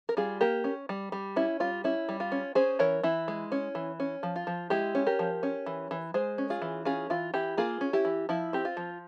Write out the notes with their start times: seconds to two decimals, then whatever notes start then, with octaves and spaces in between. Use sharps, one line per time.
0.09 A#4
0.17 G3 F4 G#4
0.41 A#3 G4 A#4
0.64 C#4
0.89 G3
1.12 G3
1.36 C#4 E4
1.60 G3 F4
1.84 C#4 E4
2.09 G3
2.20 F4
2.32 C#4
2.55 C#4 G#4 C5
2.79 E3 A#4 C#5
3.03 E3 E4
3.28 G#3
3.52 C#4
3.75 E3
4.00 C#4
4.23 F3
4.36 F4
4.47 F3
4.70 G#3 E4 G4
4.95 C#4
5.07 G4 A#4
5.19 F3
5.43 C#4
5.66 E3
5.91 E3
6.14 G#3 G#4 C5
6.38 C#4
6.50 F4 G#4
6.62 E3
6.85 C#4 F4 G#4
7.10 E3 F4
7.34 E3 E4 G4
7.57 A#3 F4 G#4
7.81 C#4
7.93 E4 G4
8.05 E3
8.29 F3 E4
8.53 C4 G4
8.65 F4
8.77 F3